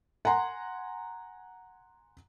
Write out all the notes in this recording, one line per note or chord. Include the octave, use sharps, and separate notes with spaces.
F#5 G#5 A#5 C6